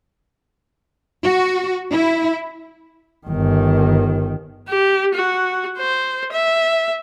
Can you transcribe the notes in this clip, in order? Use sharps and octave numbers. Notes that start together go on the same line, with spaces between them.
F#4
E4
G1 D#3
G4
F#4
C5
E5